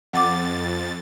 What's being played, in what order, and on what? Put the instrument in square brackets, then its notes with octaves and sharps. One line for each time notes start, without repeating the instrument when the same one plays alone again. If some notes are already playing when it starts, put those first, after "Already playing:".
[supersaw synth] F2 A6 [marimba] F#5 D6